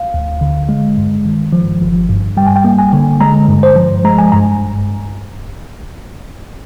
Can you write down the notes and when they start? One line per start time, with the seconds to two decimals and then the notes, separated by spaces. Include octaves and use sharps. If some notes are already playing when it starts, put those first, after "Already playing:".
Already playing: F5
0.14 D2
0.41 D3
0.69 G#3
0.97 G2
1.25 D#3
1.53 F3
1.82 G1
2.09 G2
2.37 G3 G5
2.47 G#5
2.56 G5
2.64 A#3
2.79 G#5
2.93 D3
3.21 G#3 A#5
3.49 G2
3.63 C5
3.76 F3
4.05 G#3 A#5
4.18 G#5
4.32 G2 A#5